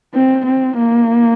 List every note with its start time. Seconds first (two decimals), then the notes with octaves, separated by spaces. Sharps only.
0.14 C4
0.46 C4
0.77 A#3